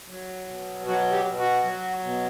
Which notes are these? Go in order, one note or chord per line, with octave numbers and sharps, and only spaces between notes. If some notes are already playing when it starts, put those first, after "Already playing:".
F#3
B2
F#3 F#4
G4
B2
F#4
F#3
B2